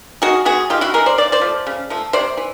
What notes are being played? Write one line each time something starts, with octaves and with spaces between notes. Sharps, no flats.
D#3 F#4 G#4
G#3 B3 F#4 G#4
D#3 F4 G4
E4 F#4
G#3 B3 G#4 A#4
C5 D5
C#3 D5
C5 D5
F3 A3
C#3
F3 A3
C3 C5 D5
E3